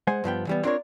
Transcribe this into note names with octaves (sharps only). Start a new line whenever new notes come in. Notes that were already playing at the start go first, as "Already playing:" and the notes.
G#3 C5 F#5 G#5
G2 F3 B3 G5
E3 G3 B3
C4 D4 F4 A#4 C#5